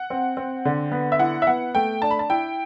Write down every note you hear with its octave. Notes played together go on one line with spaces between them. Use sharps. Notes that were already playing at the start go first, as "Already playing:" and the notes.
Already playing: F#5
C4
C4
D3
B3
E5
E4 F#5
E5
B3 F#5
A3 G5
D4 A5
B5
A5
E4 G5